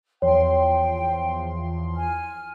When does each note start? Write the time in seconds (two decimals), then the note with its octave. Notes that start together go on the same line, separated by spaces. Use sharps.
0.22 E2 F3 C#5 G5 C6
1.97 G#5 F6